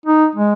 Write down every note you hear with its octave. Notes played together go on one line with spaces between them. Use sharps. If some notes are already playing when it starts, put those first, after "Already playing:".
D#4
G#3